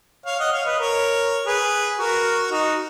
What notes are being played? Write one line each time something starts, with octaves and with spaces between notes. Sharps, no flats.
C#5 F5
D#5 F#5
C#5 F5
B4 D#5
A#4 C#5
G#4 B4
F#4 A#4
D#4 F#4